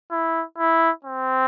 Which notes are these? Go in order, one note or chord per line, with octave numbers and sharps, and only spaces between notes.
E4
E4
C4